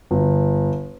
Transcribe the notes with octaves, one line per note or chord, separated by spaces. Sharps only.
G1